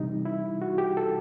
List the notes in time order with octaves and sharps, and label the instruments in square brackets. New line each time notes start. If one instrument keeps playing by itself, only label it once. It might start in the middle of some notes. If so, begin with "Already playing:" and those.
Already playing: [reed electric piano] C3 E3 G3 D#4
E4
F#4
G4
A4